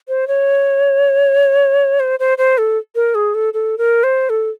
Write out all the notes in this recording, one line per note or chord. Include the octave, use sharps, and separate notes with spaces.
C5
C#5
C5
C5
C5
A4
A#4
G#4
A4
A4
A#4
C5
A4